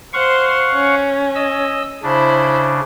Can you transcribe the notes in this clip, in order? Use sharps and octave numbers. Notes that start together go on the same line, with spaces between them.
C5 F5 F#5 C6 C#6
C#4
D#5 E6
C#3 D4 E4 C5 B5